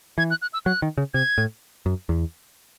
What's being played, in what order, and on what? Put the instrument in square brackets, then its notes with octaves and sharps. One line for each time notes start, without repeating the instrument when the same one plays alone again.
[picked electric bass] E3 [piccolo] G#6
[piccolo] F#6
F#6
E6
[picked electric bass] F#3 [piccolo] F#6
[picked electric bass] D#3
C#3
[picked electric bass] C3 [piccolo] G#6
[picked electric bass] A2
F#2
E2